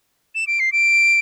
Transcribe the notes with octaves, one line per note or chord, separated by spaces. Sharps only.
E7
D7
C7
D7